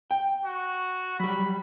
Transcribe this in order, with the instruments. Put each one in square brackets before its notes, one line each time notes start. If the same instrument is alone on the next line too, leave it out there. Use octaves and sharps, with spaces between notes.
[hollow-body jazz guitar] G5
[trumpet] F#4
[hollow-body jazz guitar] F#3 G3 [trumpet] B5